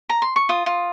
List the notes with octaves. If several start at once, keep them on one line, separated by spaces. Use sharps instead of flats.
A#5
C6
C#6
F4 D#6
F4